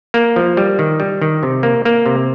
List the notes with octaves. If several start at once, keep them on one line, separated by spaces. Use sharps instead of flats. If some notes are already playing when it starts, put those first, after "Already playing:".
A#3
F3
G3
D#3
G3
D#3
C3
A#3
A#3
C3